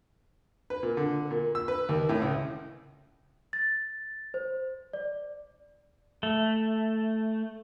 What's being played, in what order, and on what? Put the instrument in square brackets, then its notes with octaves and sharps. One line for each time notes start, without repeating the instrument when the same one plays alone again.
[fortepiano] B4
A#2
D3
A#2
E6
B4
D#2
A2
C#2
[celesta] A6
C5
D5
[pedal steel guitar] A3